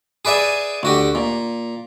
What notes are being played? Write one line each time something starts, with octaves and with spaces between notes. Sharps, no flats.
G#4 B4 D5 E5 G#5
D2 F#4 G4
A#2